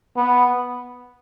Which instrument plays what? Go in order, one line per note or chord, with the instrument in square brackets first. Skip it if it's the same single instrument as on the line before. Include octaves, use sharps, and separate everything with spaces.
[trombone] B3